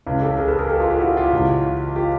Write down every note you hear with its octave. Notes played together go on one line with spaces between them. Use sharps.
C#2 C#3 E3
G4 A4
G#4 A#4
A4 B4
G#4 A#4
G4 A4
F4 G4
F4 G4
E4 F#4
F4 G4
C#2 C#3 E3
F4 G4